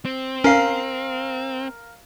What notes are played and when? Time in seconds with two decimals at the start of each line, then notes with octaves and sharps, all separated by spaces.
0.05 C4
0.44 C#4 A#4 F5 C7